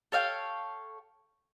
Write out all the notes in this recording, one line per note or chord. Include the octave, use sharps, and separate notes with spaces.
A4 C#5 F5 G5